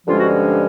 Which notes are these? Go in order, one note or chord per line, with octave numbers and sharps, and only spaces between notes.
G2 D3 F3 G#3 C#4 F4
F#4